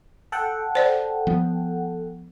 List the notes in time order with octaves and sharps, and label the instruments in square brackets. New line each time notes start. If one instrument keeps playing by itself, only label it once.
[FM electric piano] A4 F#5 G5
[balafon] C5 D5
[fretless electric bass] F3 B3